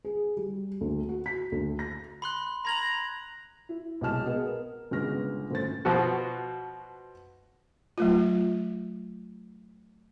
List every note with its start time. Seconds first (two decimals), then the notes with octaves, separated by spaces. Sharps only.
0.05 G#4
0.37 G3
0.81 D2
1.09 F#4
1.26 B6
1.52 D2
1.79 A#6
2.22 B5 C6 F#6
2.65 A#5 B5 G#6 F#7
3.69 E4
4.01 B1 C3 G#3 A5 F6 E7
4.24 B3 G#4 D#5
4.46 A#4
4.91 G1 C#3 G#3 B3 F6 A#6
5.51 G1 A3 C4 C#4 A6
5.85 B2 F3 F#4
7.98 F#3 A3 F4